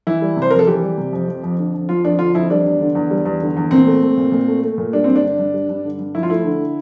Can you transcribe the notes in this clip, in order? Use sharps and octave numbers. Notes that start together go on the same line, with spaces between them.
E3 E4
G3
C3
C5
F2 A#4
A4
E3 G4
G3
C3
F2
F3
F2
D3
F2
F3 F4
F2 D4
D3 F4
F2 E4
G3 D4
E2
D3
E2
G3
E2
D3
E2
A#2 C4
A3
A3
A#2
A#2
A3
A3
A#2
G3 D4
G2 C4
D4
D3
G2
G3
G2
D3
G2
F3 E4
F4
A3 E4
D3